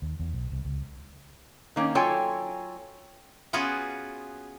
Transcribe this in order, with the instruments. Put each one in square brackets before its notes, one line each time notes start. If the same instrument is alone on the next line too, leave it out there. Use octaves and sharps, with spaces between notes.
[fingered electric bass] D#2
E2
B1
C2
C#2
[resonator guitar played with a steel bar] D#3 A#3 C#4
F#3 F4 A4 C#5 G5 G#5
[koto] B3 C#4 F4 F#4 G#4